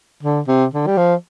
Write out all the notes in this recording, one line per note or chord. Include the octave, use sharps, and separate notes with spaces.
D3
C3
D3
G3
F3